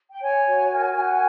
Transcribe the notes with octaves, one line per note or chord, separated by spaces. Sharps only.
G5
C#5 G#5
F#4
A#4
F#4